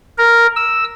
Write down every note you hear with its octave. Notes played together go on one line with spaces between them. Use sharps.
A#4
E6